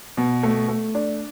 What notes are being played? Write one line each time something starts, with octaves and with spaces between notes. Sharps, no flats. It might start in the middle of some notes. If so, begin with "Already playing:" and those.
B2
A3
A3
D4